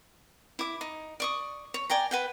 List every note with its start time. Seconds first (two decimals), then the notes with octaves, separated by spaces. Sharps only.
0.59 E4 D6
0.81 D#4
1.20 D5 C#6 D#6
1.74 C#5
1.90 D5 G5 G#5 A#5
2.11 B4 F#5 G5